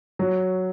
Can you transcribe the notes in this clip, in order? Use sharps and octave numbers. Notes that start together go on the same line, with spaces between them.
F#3